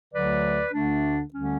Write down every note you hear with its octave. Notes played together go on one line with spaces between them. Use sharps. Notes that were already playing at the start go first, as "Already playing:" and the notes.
D2 D3 F#3 B4 D5
D2 D3 A3 D4
D2 D3 G3 C#4